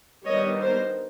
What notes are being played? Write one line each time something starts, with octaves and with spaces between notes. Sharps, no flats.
D#3 G3 B3 D4 C#5 D#5
A#4 C5